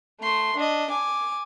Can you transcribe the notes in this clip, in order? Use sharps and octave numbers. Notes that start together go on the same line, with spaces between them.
A3 C6
D4 D#5
G#5 D6